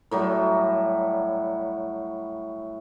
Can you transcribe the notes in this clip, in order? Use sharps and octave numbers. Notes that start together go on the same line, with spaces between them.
A2 F#3 G3